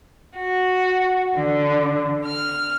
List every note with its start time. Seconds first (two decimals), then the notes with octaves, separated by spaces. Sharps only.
0.37 F#4
1.38 D3
2.24 F6